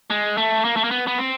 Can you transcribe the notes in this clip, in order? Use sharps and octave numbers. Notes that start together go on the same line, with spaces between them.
G#3
A3
A#3
A3
A#3
B3
B3
C4